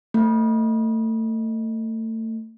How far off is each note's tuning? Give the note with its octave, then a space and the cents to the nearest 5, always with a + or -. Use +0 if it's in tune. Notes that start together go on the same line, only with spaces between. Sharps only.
A3 +30